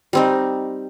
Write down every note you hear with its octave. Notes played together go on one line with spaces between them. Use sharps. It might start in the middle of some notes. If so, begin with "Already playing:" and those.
G3 C4 D#4